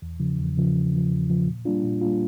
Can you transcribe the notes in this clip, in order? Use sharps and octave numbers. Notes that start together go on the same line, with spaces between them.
E2
C#3 F3
E2
C#3 F3
E2
C#3 F3
E2
C#3 F3
A#2
G3 A#3 D4 F4
A#2
G3 A#3 D4 F4